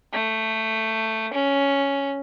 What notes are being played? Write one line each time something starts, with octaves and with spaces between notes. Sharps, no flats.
A3
C#4